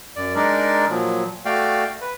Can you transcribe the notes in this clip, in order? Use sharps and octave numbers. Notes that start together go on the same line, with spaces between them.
F#2 D5
G#3 D4 D#4 A#4 D5
A#2 F3 F#3
A3 F#4 D5 F5 G5
B4